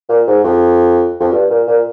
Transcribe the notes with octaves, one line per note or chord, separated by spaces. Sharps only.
A#2
G#2
F2
F2
G2
A#2
A#2